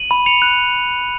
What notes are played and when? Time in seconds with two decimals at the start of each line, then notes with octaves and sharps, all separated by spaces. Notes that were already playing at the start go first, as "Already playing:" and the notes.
Already playing: D#7 F#7
0.11 B5
0.26 C#7 F7
0.42 F#6